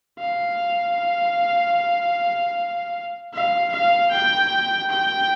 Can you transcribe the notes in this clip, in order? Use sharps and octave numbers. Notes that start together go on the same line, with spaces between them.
F5
F5
F5
G5
G5